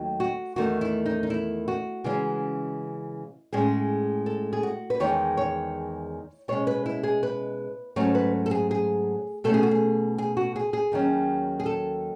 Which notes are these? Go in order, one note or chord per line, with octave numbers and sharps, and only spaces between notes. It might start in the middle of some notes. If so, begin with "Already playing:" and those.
Already playing: D#2 D#3 F#3 A3
F#4
E2 D#3 A3 D#4 F#4
E4
D#4
D#4
E4
F#4
C#3 E3 G#3 C#4
A2 G#3 C#4 G#4
A4
G#4
F#4
B4
E2 D#3 G#3 D#4 C#5
C#5
B2 G#3 C#4 C#5
B4
E4
G#4
B4
G#2 F#3 A3 C#4 C#5
B4
A4
G#4
G#4
B2 A3 C#4 A4
G#4
F#4
G#4
G#4
F#4
G#4
G#4
D#2 D#3 F#3 C#4
G#4
A4